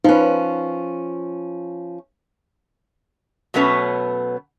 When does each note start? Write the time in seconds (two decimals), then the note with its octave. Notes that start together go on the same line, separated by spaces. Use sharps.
0.04 F3 C#4 D#4 B4
3.54 B2 F#3 A3 B3 C#4 B4